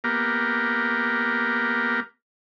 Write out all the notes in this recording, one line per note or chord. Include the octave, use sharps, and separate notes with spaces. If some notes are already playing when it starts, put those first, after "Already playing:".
A#3 B3 G4 A#4